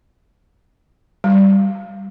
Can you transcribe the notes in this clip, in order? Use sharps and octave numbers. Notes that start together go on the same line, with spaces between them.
G3